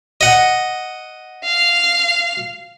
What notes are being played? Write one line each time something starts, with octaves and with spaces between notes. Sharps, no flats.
D#5 F#5
F5